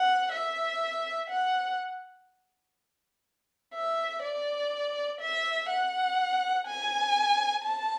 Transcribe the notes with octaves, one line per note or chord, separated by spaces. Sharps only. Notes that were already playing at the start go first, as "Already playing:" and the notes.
Already playing: F#5
E5
F#5
E5
D5
E5
F#5
G#5
A5